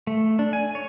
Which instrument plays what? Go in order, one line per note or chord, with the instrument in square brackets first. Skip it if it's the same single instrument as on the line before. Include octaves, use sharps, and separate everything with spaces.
[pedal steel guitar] A3
D4
G#5
C#5